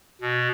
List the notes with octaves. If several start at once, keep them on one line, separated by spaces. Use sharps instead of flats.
B2